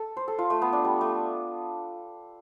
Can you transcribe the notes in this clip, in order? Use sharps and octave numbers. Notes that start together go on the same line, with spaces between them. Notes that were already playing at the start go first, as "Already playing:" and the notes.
Already playing: A4
C5
A4
F4
A3
B3
D4
G3
A3